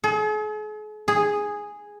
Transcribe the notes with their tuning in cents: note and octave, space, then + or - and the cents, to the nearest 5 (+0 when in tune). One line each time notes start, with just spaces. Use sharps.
G#4 +45
G#4 -5